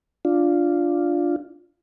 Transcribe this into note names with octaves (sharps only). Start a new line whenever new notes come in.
D4 F4